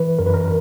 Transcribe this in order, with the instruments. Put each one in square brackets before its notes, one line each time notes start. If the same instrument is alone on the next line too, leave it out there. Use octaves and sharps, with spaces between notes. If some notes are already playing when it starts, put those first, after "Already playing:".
Already playing: [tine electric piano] E3 B4
F#2 A#4
B4
A#4